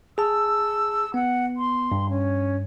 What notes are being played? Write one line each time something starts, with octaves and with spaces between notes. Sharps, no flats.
G#4 A5 E6
B3 F#5
C6
G2
C#4